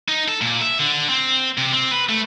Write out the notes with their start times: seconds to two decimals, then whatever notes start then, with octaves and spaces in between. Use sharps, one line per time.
0.09 D#4
0.28 A4
0.42 A#2
0.61 E5
0.79 D3
1.09 C4
1.58 C3
1.73 C4
1.91 B4
2.09 A3